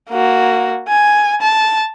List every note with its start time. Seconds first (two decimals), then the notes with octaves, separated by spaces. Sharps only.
0.10 A#3 F#4
0.88 G#5
1.41 A5